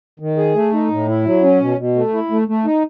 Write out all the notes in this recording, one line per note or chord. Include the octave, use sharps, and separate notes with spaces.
D#3
G#4
A3
D#4
A2
E4
F#3
C#4
B2
B2
A3
E4
A3
A3
D#4